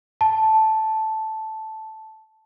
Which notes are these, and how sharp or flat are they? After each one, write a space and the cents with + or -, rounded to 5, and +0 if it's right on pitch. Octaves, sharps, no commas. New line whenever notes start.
A5 -5